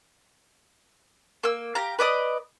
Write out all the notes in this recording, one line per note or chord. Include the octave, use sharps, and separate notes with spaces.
A#3 E6
G4 F5 A#5
B4 D5 D#5 D#6